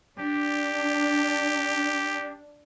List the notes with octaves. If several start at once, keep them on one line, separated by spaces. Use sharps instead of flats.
D4 G4